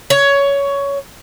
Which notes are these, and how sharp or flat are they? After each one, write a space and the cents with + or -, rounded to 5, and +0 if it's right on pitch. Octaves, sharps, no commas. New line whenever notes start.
C#5 +15